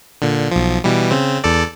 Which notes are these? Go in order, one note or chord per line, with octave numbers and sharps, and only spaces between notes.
A#2 D3
B1 F3
B2 E3 G3
C#3 C4
E2 A4 D5